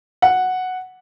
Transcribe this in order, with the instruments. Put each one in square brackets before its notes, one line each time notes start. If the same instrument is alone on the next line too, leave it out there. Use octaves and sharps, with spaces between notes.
[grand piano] F#5